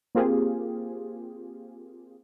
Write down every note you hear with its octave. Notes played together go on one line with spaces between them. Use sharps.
A#3 C4 F4 G4 G#4